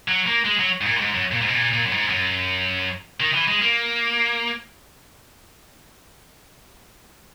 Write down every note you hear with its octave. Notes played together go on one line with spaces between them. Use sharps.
F#3
A#3
G#3
F#3
G#2
A#2
F#2
G#2
F#2
A#2
G#2
B2
A#2
A#2
F#2
G#2
F#2
D#3
E3
G#3
A#3